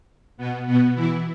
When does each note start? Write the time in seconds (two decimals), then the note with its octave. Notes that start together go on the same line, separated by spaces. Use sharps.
0.37 B2 B3
0.66 B2 B3
0.95 E3 E4